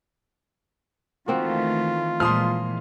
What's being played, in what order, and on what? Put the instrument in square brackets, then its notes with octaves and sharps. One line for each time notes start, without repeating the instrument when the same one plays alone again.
[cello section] D#3 E3 A3 [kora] A#3 C4 F#4 [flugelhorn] F4
[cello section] A#2 E3 G#3 [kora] F3 [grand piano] C6 D#6 F6